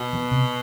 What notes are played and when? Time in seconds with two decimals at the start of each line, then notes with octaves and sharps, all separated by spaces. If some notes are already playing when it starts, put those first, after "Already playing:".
Already playing: B2
0.13 E3 B3
0.31 C3